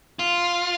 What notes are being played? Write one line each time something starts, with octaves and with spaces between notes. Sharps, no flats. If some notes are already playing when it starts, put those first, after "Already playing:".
F4